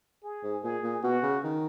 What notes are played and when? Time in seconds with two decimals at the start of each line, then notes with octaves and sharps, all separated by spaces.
0.23 G#4
0.43 G#2
0.63 A#2 G#4
0.83 A#2
1.03 B2 F#4
1.23 C#3
1.44 D#3